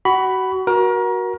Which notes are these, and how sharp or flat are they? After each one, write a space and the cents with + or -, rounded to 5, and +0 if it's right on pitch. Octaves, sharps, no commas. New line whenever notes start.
F#4 +25 B5 +0
F#4 +0 A#4 +30